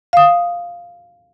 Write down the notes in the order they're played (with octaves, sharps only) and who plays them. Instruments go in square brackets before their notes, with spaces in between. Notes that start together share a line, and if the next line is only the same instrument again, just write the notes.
[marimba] F5 D#6